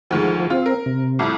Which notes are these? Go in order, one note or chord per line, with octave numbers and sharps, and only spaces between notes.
D2 D#3 F3 G#3
C4 F4
A#4
C3
C2 F2 A2